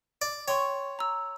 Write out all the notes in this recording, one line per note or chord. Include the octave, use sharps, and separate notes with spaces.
D5
C#5 G5 C6 C#6
A#5 E6